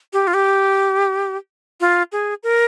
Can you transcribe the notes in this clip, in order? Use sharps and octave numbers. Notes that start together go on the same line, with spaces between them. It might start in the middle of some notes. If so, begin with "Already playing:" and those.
G4
F4
G4
F4
G#4
A#4